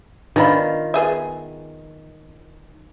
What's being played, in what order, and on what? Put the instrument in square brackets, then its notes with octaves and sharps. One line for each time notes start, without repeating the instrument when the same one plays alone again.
[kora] D#3 F4 [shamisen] B3 D4 B5
[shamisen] B3 G#4 E5